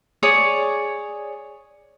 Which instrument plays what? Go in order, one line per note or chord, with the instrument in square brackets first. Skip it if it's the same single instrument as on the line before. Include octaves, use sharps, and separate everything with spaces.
[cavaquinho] G#4 C#5 D5 D#6